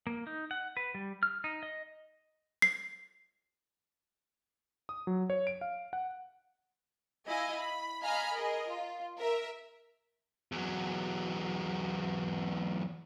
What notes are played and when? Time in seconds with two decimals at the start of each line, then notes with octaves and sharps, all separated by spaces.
0.07 A#3
0.27 D#4
0.51 F#5
0.77 B4
0.95 G3
1.23 F6
1.44 D#4
1.63 D#5
2.62 C7
4.89 D#6
5.07 F#3
5.30 C#5
5.47 D7
5.61 F5
5.93 F#5
7.27 E4 D#5 F5 G#5
7.57 B5
8.01 D#5 F5 G#5 A#5 B5 F6
8.32 G#4 A#4 D#5
8.68 F4
9.18 A#4 E5
10.52 E2 F#3